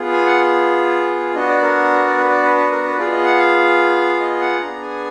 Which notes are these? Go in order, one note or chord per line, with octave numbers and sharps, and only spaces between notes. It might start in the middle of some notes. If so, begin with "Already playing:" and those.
Already playing: B3 F4 G#4
G#5
F#5
B3 D4 F#4 D#5
D5
A#4
D5
B4
D5
B4
B4
A#4
B4
B3 F4 G#4 D5
D#5
F#5
F5
D#5
F#5
B3 D4 G#4 A#5
G#5